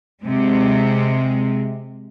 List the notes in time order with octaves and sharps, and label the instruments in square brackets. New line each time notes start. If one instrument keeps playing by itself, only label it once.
[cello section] C3 G#3